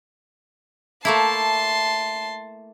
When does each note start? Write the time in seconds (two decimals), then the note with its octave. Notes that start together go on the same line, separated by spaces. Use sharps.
1.05 A3 A#3 E4 A5 C6